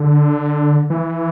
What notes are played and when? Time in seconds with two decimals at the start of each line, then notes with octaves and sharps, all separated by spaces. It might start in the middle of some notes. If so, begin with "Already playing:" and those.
Already playing: D3
0.90 E3